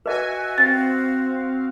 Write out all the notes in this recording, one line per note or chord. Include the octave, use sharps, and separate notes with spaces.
F#4 B4 D#5 E5 G#5
C4 F5 A6